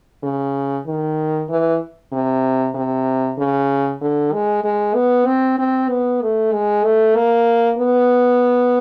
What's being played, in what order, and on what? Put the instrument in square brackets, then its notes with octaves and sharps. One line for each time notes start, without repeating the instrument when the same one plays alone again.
[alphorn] C#3
D#3
E3
C3
C3
C#3
D3
G#3
G#3
B3
C4
C4
B3
A3
G#3
A3
A#3
B3